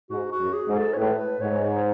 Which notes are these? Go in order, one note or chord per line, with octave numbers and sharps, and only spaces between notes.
G#2 F#4
F#4
F#2
G#4
G#2
A4
C#5
A2 B4
B4
G#2 C#5
C#5